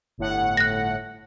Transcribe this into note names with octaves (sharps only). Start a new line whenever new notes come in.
G1 A2 F#5
F#6 A#6